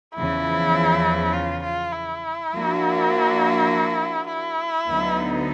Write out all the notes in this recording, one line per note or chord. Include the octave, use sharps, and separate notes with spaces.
E2 C#3 F3 E4
F4
F4
E4
F3 A#3 D4 F#4
E4
D2 D3 F#3 B3 D#4